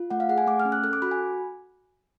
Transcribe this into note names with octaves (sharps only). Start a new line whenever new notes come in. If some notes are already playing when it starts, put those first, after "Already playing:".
Already playing: F4
A3 F#5
F5
G#4 F#5
G#5
A3 D6
F6
C#4
F#6
A4 F#6
D6
F#4 B5
G#5